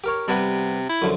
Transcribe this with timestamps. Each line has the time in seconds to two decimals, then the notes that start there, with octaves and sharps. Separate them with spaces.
0.04 G4 A#4 C#5
0.28 C3 G3 B3 B4
0.89 E4
1.02 F#2 D3 F3